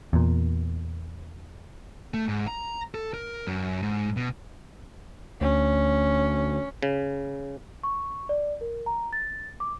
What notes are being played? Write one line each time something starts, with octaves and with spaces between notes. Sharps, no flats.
E2 A#2
A3
G#2
A#5
A4
A#4
F#2
G#2
B2
D2 C#4
C#3
C#6
D5
A#4
A#5
A6
D6